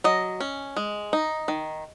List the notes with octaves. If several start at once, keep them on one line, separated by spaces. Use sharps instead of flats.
F#3 D#5
C#4
G#3
D#4
D#3